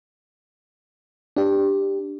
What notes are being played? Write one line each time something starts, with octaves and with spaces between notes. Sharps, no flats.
D4 G4